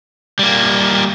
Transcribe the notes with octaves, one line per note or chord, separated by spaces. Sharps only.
G3 A#3